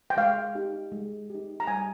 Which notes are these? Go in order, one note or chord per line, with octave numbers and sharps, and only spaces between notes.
G5
G#3 F5
D#4 G4
G#3
D#4 G4
A#5
G3 G#5